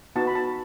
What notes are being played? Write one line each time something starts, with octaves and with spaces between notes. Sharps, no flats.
B3 D#4 F#4 A5
B5
A5